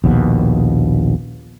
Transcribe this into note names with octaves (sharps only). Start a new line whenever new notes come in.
A#1 D#2 B2